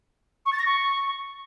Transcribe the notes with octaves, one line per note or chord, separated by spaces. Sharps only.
C#6
A6
A#6
C#6